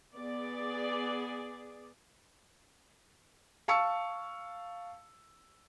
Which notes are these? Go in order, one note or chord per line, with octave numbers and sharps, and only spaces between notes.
B3 G#4 D5
F5 A5 C#6 E6 C#7